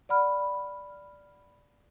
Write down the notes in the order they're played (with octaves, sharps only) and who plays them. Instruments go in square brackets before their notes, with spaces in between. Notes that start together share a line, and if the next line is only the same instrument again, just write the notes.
[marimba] D5 F#5 B5 F6